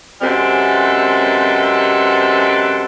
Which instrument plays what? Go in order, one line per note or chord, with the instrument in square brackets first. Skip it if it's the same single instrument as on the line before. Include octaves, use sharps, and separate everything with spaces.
[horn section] F#2 C3 G#3 C4 A4 B4